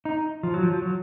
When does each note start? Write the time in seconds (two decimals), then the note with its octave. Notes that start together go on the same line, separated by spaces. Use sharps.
0.05 D#4
0.43 F3
0.54 F#3
0.63 F3
0.82 F#3